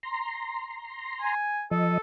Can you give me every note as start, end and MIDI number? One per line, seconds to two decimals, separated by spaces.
0.03 1.35 82
0.03 1.35 84
1.22 1.64 80
1.71 1.98 53
1.71 2.00 69
1.71 1.98 75